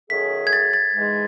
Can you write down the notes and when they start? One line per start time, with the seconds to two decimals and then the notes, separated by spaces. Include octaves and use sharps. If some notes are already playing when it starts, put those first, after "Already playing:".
0.10 D#3 F#3 A3 C#4 G#4 B6
0.47 G#6
0.53 A6
0.73 A6
0.95 G#2 E3 G#3